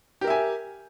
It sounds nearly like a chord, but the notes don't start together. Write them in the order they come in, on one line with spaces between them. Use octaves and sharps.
G4 A#4 E5 G#5